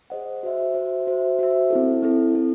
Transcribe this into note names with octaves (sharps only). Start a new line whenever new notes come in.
G#4 C5 D#5 F#5
F#4 C5 E5
F#4 C5 E5
F#4 C5 E5
F#4 C5 E5
C4 E4 A4
C4 E4 A4
C4 E4 A4